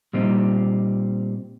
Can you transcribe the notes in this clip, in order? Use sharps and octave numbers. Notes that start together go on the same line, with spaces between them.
A#2 G3 C4 D#4